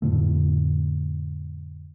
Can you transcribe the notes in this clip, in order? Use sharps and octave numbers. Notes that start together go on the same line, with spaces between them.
F2 A2 D3 A3